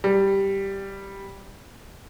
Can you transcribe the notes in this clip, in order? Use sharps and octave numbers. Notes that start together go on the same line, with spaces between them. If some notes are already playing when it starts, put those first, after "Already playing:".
G3